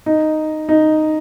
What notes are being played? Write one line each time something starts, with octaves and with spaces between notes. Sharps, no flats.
D#4
D#4